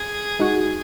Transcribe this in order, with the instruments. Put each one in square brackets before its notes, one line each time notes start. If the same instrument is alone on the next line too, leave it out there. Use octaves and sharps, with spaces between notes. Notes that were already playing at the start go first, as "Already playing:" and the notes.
Already playing: [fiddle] G#4
[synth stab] G#3 D#4 F#4